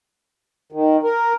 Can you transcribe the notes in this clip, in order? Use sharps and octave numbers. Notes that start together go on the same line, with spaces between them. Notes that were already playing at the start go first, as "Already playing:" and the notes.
D#3
A#4